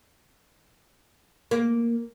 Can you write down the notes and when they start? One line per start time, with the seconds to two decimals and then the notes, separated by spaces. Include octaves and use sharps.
1.51 A#3